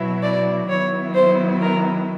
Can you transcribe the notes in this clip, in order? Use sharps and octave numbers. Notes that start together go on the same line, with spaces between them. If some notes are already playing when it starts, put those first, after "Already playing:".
Already playing: B2 F#3 B3 E4
D5
D#3 F#3 B3 E4 C#5
C5
A#4